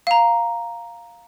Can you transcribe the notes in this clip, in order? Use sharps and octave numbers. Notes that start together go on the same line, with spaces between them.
F5 A#5